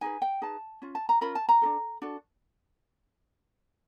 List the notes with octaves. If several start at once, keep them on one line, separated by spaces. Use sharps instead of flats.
D#4 G#4 B4 G#5
G5
D#4 G#4 B4 A5
C#4 F4
A5
A#5
C#4 F4 A#4 B5
A5
A#5
D4 F#4 A4
D4 F#4 A4